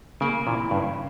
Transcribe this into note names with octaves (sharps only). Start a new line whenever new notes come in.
C#3 A#3
A#2 E3
G2 C#3